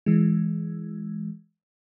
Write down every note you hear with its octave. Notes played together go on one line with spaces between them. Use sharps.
E3 G#3